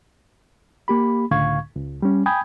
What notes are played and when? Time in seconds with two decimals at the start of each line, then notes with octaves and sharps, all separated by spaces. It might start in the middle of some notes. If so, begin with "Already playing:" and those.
0.88 A#3 G4 B5
1.31 C#2 A2 D3 F5 C#6 G#6
1.75 C#2
2.02 G3 C#4
2.26 G5 G#5 B5 D#6 G6 G#6